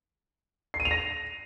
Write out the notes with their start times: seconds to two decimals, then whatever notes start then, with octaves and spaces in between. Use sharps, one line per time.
0.74 C7
0.80 D#7
0.85 F7
0.91 A#6